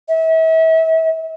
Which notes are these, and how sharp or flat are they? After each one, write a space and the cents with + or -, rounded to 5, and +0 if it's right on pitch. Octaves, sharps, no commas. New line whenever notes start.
E5 -35